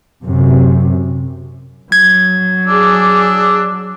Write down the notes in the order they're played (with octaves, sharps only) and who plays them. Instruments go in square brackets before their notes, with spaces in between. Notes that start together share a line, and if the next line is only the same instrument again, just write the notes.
[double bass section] F#2 C3
[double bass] F#3 [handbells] G#6
[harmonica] D4 E6 [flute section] G#4 D6